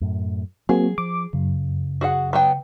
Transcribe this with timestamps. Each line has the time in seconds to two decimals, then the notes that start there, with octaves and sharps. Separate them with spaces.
0.01 F#2 A2
0.69 F#3 A#3 C4 F#4 G#4
0.98 F3 D6
1.33 F#2 C#3
2.01 F#4 G#4 F#5
2.33 F#3 B3 G5